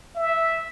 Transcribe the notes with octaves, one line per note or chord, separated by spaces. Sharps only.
E5